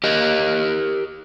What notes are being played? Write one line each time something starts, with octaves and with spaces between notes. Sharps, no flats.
G4 A#4 D#5